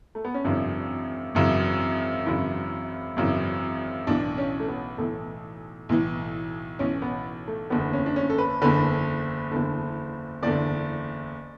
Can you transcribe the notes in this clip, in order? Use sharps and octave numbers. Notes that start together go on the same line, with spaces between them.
A3
B3
C#4
G#1 F#2 C#3 E3 D4
G#1 F#2 C#3 E3
G#1 F#2 C#3 E3 E4
G#1 F#2 C#3 E3
B1 A2 E3 D4
C#4
A3
B3
B1 A2 E3 A3
B1 A2 E3
B1 A2 E3 C#4
B3
A3
F#1 E2 D3 B3
C#4
D4
C#4
A4
B4
F#1 E2 D3 B4
F#1 E2 D3
F#1 E2 D3 D5